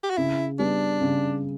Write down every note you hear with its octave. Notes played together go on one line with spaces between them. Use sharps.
G4
F#4
C#3 E4
G3 B3 D4
C#3